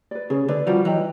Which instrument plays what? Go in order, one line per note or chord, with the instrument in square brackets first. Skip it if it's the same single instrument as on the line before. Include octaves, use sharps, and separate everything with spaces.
[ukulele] B4 D5
[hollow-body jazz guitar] C#3 [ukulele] G#4
[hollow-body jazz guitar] D3 [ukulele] B4 D5
[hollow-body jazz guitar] F3 G3 [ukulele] F#4
[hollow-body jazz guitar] E3 F#3 [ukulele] B4 D#5 G5